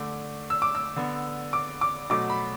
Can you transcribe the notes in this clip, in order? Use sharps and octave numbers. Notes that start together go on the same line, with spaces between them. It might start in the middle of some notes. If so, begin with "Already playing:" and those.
Already playing: D3 A3 D6
E6
D6
E6
D3 B3
D6
D6
B2 F#3 A3 D6
B5